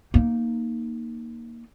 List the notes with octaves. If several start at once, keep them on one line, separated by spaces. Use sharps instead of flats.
A#3 D#4